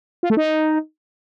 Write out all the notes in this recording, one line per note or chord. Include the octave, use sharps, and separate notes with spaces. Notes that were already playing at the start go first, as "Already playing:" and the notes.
F4
A3
D#4